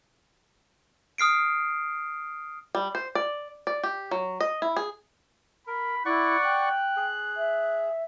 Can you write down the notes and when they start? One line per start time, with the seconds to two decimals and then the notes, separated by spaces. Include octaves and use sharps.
1.18 D#6 F6 C7 D7
2.75 G3
2.95 C5
3.15 D5
3.67 D5
3.84 G4
4.11 F#3
4.41 D#5
4.62 E4
4.77 G#4
5.67 A#4 B5
6.05 E4 D5 F#5 C#6 F#6
6.44 G5
6.97 G#4
7.37 E5